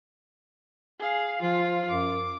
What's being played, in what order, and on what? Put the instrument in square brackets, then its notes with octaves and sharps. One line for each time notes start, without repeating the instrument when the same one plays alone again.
[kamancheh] G#4 F5
[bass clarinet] F3 [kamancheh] F4
[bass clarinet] F#2 [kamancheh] D6